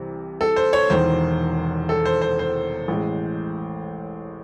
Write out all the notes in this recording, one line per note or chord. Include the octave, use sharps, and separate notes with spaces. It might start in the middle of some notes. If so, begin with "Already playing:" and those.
Already playing: C2 C3 E3
A4
C5
C#5
E1 E2 D#3 C5
A4
C5
C5
C5
A1 A2 G#3